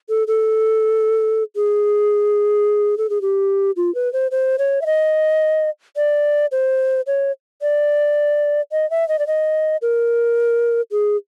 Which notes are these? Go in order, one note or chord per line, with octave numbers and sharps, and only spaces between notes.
A4
A4
G#4
A4
G#4
G4
F4
B4
C5
C5
C#5
E5
D#5
D5
C5
C#5
D5
D#5
E5
D#5
D5
D#5
A#4
G#4